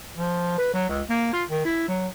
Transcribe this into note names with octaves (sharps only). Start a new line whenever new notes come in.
F3
B4
F#3
C#2
A#3
F4
D#3
E4
F#3